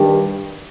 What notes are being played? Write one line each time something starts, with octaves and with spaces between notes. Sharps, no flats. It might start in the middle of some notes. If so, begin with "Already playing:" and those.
Already playing: G2 D#3 G3 D4 G4